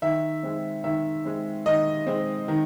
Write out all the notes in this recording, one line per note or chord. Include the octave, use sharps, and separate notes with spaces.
D#3 E5
G#3 C4
D#3 E5
G#3 C4
D#3 D#5
G#3 C4
D#3